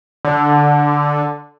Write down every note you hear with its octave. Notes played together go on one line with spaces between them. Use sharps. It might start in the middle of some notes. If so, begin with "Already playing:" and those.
D3